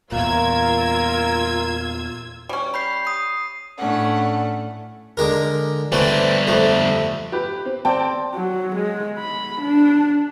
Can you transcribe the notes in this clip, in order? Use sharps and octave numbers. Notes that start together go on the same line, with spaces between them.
E2 A#2 F4 A#4 F5 A#5 E6 G#6
G3 C#4
B5 G6 C7
D#6 C7
A2 A3 C#4 D4 F#5
D3 G#3 A#4
D3 E3 G3 A3 C4
F2 A3
G4 B4
C4
C4 D5 G5 A5
F#3
G#3
B5
D4